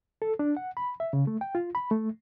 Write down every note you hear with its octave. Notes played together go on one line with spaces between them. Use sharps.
A4
D4
F#5
B5
E5
C#3
A3
G5
F4
B5
A3